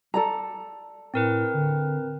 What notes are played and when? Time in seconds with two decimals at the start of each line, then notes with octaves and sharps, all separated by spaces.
0.14 A4 D5 A#5
1.14 A2 C4 A#4 B4
1.54 D3